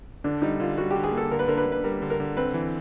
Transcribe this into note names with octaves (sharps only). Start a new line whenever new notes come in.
D3 D4
G3 D#4
D3 F4
G3 F#4
G4
D3
G#4
A#3
A4
D3 A#4
B4
D3 A#4
B4
D3
B4
G3 A#4
D3
A#4
D3
C4 B4
E3